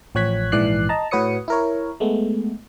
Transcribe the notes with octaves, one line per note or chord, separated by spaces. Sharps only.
A1 F3 C#5 F#6 G#6 B6
A#1 G#2 E3 D5 F#6 C7
D#5 A5 A#5
A2 F#4 B4 C#5 D#6 C#7
E4 A#4 C#5
G#3 A3 B3